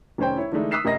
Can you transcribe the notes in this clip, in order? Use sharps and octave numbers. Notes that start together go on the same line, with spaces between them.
F1 D#3 C#4 C5 G5
E4 C#5
D3 E3 G#3 A3 D4 D#4
D#6 E6 F#6 B6 C7 E7
F1 F#2 A#4 D#5 A#6